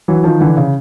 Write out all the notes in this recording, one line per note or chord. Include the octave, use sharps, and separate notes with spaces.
E3 F#3
D#3 F3
D3 E3
C#3